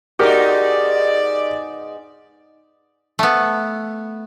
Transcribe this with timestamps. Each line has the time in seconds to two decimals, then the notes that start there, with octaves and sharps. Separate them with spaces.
0.19 G#2 B3 D#4 F#4 G4 A#4 D5
3.19 A3 B3